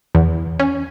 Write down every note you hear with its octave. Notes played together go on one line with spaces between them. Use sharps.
E2
C#4